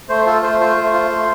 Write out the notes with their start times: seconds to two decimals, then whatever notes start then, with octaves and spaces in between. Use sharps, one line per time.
0.09 A3 C5
0.26 F4 A4
0.42 A3 C5
0.60 F4 C5
0.76 A3
0.93 F4
1.10 A3